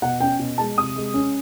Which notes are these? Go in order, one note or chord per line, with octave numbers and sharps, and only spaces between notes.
B2 F#5
C#4 G5
B2
G#3 A5
C3 D#6
G#3
C#4